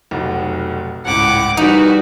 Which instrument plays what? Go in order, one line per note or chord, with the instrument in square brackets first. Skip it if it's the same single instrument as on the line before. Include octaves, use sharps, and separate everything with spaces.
[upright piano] F1 B1 F#4
[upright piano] G#1 C#2 A2 [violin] F#5 D6
[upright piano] E3 G3 [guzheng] D#4 [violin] F#4 B4